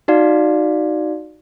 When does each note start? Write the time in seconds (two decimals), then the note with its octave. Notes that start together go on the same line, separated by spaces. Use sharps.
0.08 D#4 F#4 D5 F5